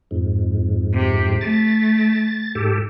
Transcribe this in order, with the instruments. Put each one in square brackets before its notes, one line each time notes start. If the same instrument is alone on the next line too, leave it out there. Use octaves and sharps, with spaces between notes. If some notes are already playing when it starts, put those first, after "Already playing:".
[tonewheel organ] F2 G#2
[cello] C3 G4
[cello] A3 [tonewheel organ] A6
[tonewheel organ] G#2 G4 A4